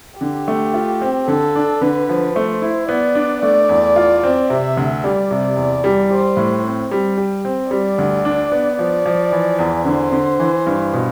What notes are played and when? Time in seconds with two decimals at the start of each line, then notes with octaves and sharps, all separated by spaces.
0.20 D3 G4
0.48 A3
0.74 F4
1.02 C4
1.28 D3 A4
1.55 D4
1.81 D3 B4
2.09 F3
2.35 A3 C5
2.62 E4
2.88 B3 D5
3.15 D4
3.42 A3 D5
3.69 E2
3.96 F4
4.23 C4
4.49 C3 E5
4.77 D2
5.04 G3 D5
5.31 C3
5.56 E2
5.84 G3
6.11 G4 C5
6.37 A2
6.64 C4
6.91 G3
7.18 G4
7.45 C4
7.71 G3 D5
7.98 D2
8.25 D4
8.52 B3
8.79 F3 D5
9.06 F3
9.32 E3
9.59 E2
9.85 D3 C5
10.12 D3
10.39 E3
10.66 G2
10.93 B2